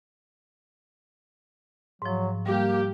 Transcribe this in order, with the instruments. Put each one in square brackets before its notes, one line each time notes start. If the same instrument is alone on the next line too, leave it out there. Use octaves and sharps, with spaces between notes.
[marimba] G#2 F3 [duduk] F#3
[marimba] G3 [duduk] A#3 [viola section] G4